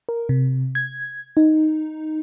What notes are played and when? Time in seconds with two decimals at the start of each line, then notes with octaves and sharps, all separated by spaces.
0.09 A#4
0.29 C3
0.75 G#6
1.37 D#4